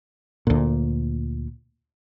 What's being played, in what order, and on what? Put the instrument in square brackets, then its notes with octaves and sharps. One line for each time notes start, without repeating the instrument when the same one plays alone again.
[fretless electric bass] D2 A#2